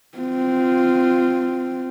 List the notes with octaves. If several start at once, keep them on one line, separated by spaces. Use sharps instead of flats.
C4 F4